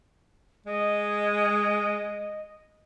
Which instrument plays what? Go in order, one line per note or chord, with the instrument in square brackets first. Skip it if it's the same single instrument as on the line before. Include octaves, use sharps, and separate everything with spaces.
[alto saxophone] G#3 [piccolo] D#5